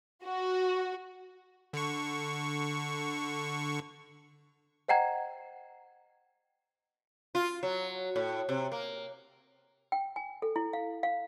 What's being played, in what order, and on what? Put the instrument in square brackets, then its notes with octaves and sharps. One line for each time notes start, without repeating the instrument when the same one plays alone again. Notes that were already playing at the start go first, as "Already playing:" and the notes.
[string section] F#4
[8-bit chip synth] D3 C#6
[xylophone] C5 D#5 F#5 G5 A#5 G#6
[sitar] F4
F#3
A2
C3
A#3
[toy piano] G5
G#5
A4
E4
F5
F5